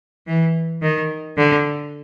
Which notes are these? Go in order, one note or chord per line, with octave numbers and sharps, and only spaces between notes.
E3
D#3
D3